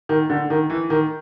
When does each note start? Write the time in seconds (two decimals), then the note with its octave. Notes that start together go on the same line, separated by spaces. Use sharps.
0.09 D#3
0.30 D3
0.50 D#3
0.70 E3
0.90 D#3